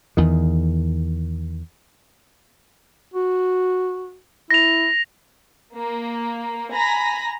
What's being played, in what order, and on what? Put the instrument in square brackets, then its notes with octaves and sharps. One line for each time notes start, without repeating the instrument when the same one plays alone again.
[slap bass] E2 D#3
[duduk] F#4
[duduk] E4 [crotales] A#6 F7
[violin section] A#3
G#5 A#5 B5 A#6